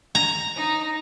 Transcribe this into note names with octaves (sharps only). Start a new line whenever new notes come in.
A#5
D#4